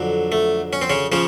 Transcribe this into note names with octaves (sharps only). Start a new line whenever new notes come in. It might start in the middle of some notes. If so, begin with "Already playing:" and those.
Already playing: F2 D3 F#3
A3
C#4
C4
C#3 C#4
C#3 F3 C#4